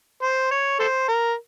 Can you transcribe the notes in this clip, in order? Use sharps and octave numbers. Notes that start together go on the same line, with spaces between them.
C5
C#5
A4 C5
A#4